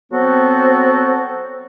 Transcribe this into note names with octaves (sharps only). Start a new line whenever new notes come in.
F#3 B3 C4 F#4 A4 C5